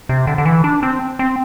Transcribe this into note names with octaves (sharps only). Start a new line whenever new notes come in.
C3
D3
D3
E3
D4
C4
C4